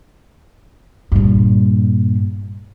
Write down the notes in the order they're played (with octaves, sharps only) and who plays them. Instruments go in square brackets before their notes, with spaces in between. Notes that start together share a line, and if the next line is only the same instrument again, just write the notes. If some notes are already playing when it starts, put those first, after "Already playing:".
[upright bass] G2 A#2